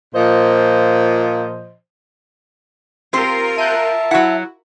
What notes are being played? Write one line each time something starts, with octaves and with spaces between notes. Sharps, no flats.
A#2 F3 C5 D#5
C4 F4 G4 A#4 C5
E5 A5 F#6 G6 D#7
F#3 E4 F#4 F#5